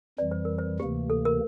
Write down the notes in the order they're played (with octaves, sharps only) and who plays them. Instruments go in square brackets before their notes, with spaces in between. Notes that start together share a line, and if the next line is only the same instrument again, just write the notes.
[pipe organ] F2 E3 G3 [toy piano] D5
[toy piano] C5
A#4
C5
[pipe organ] D2 C3 E3 A#3 [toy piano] G4
[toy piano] A4
A#4